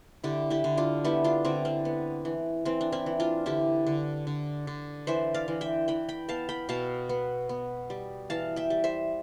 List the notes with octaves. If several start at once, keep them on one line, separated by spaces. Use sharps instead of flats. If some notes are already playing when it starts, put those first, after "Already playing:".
D3 E4 G4
E4 G4
D3
D4 F4
B3 E4 G4
D4 F4
D3 C4 E4
C4
B3
E3
E3 C4
D4
C4 E4
E3
D4 F4
D3 E4 G4
D3
D3
D3
E3 C5 E5
D5 F5
E3
E5 G5
E3 G5 B5
G5 B5
B3 F5 A5
G5 B5
B2 F5 A5
B3
B3
G3
E3 F5 A5
E5 G5
G3
C5 E5